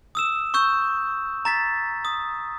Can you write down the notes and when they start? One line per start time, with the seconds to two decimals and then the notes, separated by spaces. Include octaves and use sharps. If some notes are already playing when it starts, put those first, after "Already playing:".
0.15 D#6 E6 E7
0.54 C#6 E6 G6
1.45 A#5 A6 B6
2.05 D#6